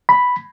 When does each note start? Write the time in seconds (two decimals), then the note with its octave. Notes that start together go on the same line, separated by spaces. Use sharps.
0.09 B5